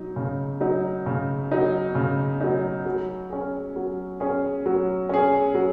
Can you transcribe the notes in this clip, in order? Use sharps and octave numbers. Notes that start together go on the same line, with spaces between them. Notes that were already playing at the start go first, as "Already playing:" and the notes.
Already playing: F#3 D#4
C#3
F#3 D#4
C#3
F#3 D#4
C#3
F#3 D#4
F#3
C#4 G#4
F#3
C#4 G#4
F#3
C#4 G#4
F#3